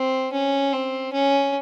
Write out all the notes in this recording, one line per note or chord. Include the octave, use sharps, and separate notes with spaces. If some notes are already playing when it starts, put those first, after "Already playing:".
Already playing: C4
C#4
C4
C#4